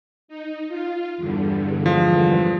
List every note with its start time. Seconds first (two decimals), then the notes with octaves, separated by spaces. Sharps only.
0.28 D#4
0.69 F4
1.17 E2 G2 D3
1.86 F3 G#3